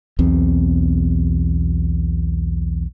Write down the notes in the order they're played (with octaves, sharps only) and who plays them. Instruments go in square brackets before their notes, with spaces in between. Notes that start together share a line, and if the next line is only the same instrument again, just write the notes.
[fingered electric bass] B1 E2 B2 C4